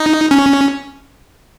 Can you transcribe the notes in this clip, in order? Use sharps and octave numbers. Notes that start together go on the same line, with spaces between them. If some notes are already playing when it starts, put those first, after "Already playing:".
Already playing: D#4
C#4